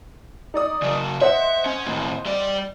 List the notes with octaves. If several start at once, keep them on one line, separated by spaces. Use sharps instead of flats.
D#4 D5 D#6
C#3 F#3
C5 D#5 E5 F#5
C#4
D#2 A2
G3 D5